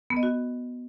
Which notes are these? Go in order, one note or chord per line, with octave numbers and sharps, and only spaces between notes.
B3
D#5
F#4